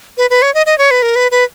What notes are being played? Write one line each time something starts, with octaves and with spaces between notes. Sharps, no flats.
B4
B4
C#5
D#5
D#5
C#5
B4
A#4
B4
B4